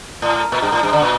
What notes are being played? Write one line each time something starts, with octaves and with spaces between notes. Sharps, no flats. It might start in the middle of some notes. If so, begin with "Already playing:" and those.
A2
A#2
G2
A2
G2
D3
A#2